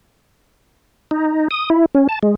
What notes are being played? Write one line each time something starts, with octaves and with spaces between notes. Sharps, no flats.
D#4
D#6
E4
C#4
A5
G#3